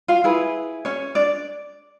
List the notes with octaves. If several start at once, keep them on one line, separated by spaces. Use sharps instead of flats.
F4 F5
E4 G#4 B4
C#4 C#5
D4 D5